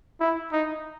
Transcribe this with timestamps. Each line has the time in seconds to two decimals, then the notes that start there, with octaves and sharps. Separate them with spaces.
0.20 E4
0.52 D#4